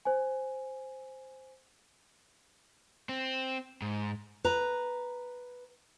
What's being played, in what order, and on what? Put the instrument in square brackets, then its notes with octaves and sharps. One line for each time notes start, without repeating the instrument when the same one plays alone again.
[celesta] C5 G#5
[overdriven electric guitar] C4
G#2
[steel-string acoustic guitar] B4 A#5